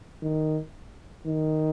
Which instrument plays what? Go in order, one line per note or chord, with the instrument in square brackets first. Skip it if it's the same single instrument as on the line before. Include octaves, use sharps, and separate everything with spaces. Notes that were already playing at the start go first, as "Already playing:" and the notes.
[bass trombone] D#3
D#3